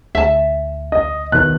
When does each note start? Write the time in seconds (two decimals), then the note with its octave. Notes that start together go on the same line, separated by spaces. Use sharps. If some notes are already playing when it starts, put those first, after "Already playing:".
0.15 D2 E5 A5
0.92 D#5
1.32 B2 D#3 F#6